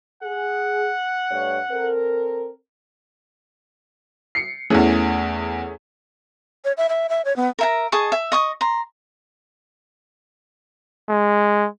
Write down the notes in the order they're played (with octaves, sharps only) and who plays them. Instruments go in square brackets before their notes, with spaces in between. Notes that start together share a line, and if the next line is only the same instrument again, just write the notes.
[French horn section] G#4 [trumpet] F#5
[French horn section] G2 A3 C#5
C4 A4 A#4
[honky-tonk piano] C7 C#7
[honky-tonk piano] E2 E3 [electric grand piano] A3 C#4 G#4
[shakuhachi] C#5
E5
E5
E5
C#5
B3
[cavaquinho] A#4 E5 A#5
G#4 D#5 A5 C#6
E5
D#5 C#6 D#6
A#5 C6
[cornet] G#3